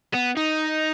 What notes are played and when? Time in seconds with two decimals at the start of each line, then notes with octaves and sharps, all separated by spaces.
0.14 B3
0.37 D#4